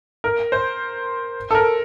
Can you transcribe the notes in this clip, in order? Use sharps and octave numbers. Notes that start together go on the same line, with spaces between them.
A#4
C5
A4
A#4